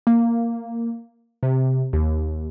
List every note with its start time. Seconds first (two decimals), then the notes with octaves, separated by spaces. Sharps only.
0.07 A#3
1.43 C3
1.93 D#2